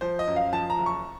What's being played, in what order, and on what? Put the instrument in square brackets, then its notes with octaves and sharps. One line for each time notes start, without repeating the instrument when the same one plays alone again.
[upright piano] F3 C5
D#5
F#2
F5
F3 A5
A#5
F#1
C#6